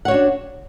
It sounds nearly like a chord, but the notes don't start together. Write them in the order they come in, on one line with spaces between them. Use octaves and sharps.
F#5 C#5 F#4 D4